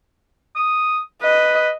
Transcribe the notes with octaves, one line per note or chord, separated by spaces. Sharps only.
D#6
B4 D#5